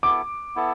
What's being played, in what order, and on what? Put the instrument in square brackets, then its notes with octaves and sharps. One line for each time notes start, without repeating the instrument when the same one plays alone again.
[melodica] B3 E4 A4 [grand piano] D6
[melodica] B3 E4 A4